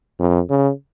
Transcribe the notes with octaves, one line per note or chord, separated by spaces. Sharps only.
F2
C#3